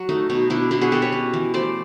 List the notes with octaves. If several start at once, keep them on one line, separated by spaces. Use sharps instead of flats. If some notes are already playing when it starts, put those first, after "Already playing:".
Already playing: F#3 F#4
A3 D#4
B2 D#4
B2 D4 E4
B2 D4 E4
F#4 G#4
B2 G4 A4
B4 C#5
C#4
E3
A3 C5 D5